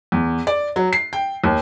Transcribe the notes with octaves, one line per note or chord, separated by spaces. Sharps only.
E2
D5
F#3
C7
G5
D#2